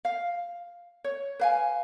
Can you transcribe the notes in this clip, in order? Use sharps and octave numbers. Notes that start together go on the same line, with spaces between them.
F5
C#5
B4 F5 G#5